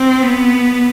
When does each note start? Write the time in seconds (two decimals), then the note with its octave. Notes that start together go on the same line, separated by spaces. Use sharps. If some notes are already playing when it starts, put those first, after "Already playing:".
Already playing: C4
0.22 B3